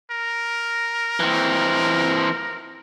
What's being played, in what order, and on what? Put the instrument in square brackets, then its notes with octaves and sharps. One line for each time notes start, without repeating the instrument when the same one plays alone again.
[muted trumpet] A#4
[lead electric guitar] E3 C4